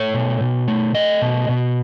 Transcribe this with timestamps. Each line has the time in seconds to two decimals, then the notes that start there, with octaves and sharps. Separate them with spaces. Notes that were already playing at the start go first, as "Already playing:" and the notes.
Already playing: A3 C#5
0.14 B2
0.41 B2
0.68 A3
0.95 A3 D#5
1.22 B2
1.49 B2